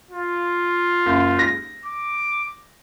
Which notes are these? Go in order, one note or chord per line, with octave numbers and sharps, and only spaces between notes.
F4
F#1
A#6
D6